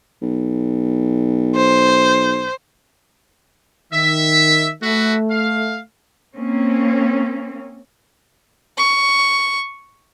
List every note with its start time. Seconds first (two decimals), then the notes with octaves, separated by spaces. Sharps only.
0.22 B1
1.56 C5
3.93 D#3 E5
4.83 A3 F#4 B4 E5
5.30 F5
6.36 A#3 C4 C#4
8.78 C#6